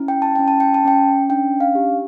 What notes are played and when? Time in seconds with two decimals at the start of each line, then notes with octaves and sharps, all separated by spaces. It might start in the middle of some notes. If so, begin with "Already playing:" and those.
Already playing: C#4 E4
0.08 G5
0.22 A5
0.35 C#4 G5
0.48 A5
0.60 G5
0.74 A5
0.85 C#4 G5
1.30 D4 G5
1.60 F5
1.75 G4